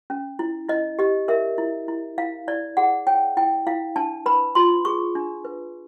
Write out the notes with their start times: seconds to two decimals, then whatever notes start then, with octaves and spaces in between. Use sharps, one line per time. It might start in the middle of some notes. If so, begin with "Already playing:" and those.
0.10 C#4
0.39 E4
0.69 E4 D#5
0.99 G4 D#5
1.28 A#4 E5
1.58 E4
1.88 E4
2.18 E4 F5
2.48 E4 D5
2.77 G#4 F#5
3.07 C#5 G5
3.37 E4 G5
3.67 E4 F5
3.96 D4 A5
4.26 B4 B5
4.55 F4 C6
4.85 G#4 C#6
5.15 D4
5.45 B4